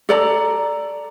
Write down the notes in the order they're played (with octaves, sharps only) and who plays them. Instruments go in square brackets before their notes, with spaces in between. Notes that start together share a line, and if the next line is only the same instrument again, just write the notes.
[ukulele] A4 D5 A#5